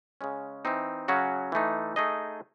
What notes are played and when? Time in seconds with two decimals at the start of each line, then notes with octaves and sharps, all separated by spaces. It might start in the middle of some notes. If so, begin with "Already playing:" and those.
0.21 C#3 G#3 C#4
0.65 E3 C4 D#4
1.08 C#3 F#3 C#4 F#4
1.52 E3 A3 D#4
1.96 A3 D#4 G#4 D#5